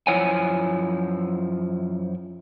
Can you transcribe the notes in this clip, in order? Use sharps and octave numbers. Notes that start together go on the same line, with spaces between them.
F#2 F3 E4 C#5 F#5 G#5